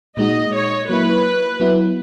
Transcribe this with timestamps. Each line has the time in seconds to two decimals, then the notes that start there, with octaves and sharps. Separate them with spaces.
0.17 A#2 G#3 D#4 F#4 D#5
0.54 C#5
0.88 F#3 A#3 E4 B4
1.60 F#3 B3 E4